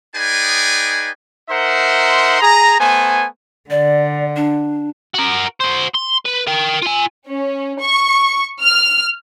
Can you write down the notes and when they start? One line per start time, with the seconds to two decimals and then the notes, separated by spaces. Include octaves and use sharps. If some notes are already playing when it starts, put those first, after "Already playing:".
0.15 D#4 G#4 B4 D5 G5 G#5
1.49 D#4 A#4 C5 E5 F#5 C6
2.40 G#4 A#5
2.80 A3 B3 C5 G#5
3.70 D3 D5
4.36 D4
5.14 F#4 A#4
5.60 F#4 C5
5.94 C6
6.25 B4
6.47 A#4 G5
6.82 F4 G#5
7.27 C#4
7.80 C#6
8.62 F6